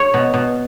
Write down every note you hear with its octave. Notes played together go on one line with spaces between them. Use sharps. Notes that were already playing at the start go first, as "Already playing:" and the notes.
Already playing: C#5
B2
B2